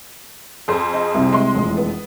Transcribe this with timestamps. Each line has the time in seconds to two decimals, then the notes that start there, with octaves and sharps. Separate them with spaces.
0.68 F2 G#4 C5
0.94 D#5
1.14 C2 C3
1.33 G#3 C6
1.54 E1 F2 A2
1.77 B3